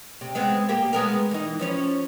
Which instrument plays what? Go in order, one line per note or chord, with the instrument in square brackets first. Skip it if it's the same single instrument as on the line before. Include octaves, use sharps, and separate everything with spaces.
[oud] C3
G#3 B3 C4
A#3 G4
G#3 B3 A#4
E3 D#4
F3 C#4 C#5